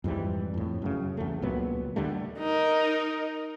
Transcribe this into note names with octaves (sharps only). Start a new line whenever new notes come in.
F2 G#2 E3 G3
F2 A2
F#2 C#3
E2 A3
C#2 A#2 F#3 B3
D#2 D3 G3 A3
D#4 A#4